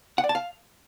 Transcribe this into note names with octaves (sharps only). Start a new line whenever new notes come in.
F#5
D5
A5
F5